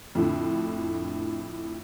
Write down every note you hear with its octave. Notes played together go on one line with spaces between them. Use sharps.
F2 A2 D3